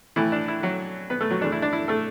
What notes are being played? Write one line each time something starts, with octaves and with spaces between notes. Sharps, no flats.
A2 E3 A3 E4
D4
E4
F#3 F#4
B3 B4
A3 A4
F#3 F#4
E2 E3 A3 D4
E4
D4
E4
A3 A4